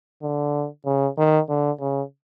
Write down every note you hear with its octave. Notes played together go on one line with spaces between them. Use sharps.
D3
C#3
D#3
D3
C#3